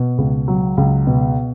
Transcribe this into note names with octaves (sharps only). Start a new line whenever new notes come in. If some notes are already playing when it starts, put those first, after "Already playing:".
Already playing: B2
C#2
F#3
C#2
B2